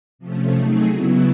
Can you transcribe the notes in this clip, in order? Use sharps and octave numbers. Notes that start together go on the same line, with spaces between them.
C3 F3 A3 C#4
F#3 A3 C4 D#4 G#4
C#3 F#3 B3 E4